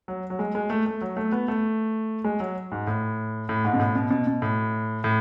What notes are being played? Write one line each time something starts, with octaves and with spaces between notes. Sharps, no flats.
F#3
F#3
G#3
G#3
A3
A3
F#3
A3
B3
A3
G#3
F#3
G#2
A2
A2
G#2
B2
A2
B2
B2
B2
A2
A2